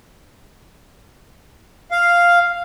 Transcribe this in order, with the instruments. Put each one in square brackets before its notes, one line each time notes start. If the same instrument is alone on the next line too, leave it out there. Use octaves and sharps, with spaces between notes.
[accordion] F5